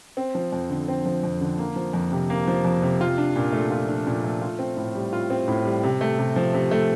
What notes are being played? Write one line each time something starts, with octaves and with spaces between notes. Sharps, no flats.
C4
F3
F2
D3
C4
F3
F2
D3
A#3
F3
F2
C3
A#3
F3
F2
C3
F4
D4
A#2
A3
F4
D4
A#2
A3
F4
C4
A2
G3
F4
C4
A2
G3
C3
A3
C3
F3
C3
A3